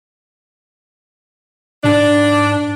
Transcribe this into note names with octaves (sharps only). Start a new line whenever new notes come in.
G#2 D4